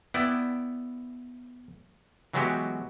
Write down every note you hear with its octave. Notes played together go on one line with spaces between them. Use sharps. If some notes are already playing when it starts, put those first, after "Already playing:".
B3 E4 D5 G5
E3 F#3 G#3 B3 F#4 G4